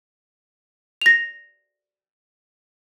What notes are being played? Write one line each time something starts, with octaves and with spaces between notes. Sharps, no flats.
A#6 F7